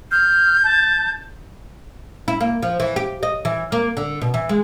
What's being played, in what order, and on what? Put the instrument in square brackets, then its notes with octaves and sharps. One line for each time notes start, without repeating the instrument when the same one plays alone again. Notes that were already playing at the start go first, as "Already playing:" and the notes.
[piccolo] F6 [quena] G6
[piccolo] A5
[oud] E4
A#3
F3
E3
G4
D#5
E3
A#3
D3
B2
E3
G#3